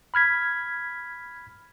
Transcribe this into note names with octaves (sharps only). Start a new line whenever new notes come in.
B5 F6 G#6 B6